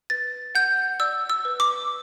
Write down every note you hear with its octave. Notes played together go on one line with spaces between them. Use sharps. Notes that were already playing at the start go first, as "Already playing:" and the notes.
B4 A6
F#5 G6
D5 E6
E6
B4
D6